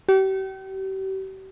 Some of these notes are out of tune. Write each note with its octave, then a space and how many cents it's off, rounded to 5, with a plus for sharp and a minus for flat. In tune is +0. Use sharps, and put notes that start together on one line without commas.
G4 -40